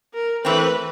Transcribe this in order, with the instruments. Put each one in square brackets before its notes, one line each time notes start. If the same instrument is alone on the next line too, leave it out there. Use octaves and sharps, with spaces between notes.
[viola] A#4
[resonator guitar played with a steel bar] E3 A3 C4 [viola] B4